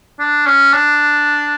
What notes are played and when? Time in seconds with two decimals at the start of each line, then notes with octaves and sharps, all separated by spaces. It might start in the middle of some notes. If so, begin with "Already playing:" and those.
0.20 D4
0.46 C#4
0.73 D4